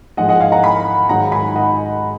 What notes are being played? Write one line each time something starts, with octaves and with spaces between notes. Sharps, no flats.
G#2 F3 G#3 D#5 F#5
D#5 F#5
F5 G#5
F#5 A#5
G#5 B5
G#2 D#3 F#3 F#5 A#5
G#5 B5
D#5 F#5